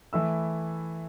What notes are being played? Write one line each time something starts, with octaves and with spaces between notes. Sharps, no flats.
E3 A3 E4 E6